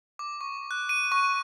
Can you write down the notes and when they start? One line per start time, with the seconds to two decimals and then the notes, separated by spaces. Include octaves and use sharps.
0.19 D6
0.41 C#6
0.71 F#6
0.89 D#7
1.12 C#6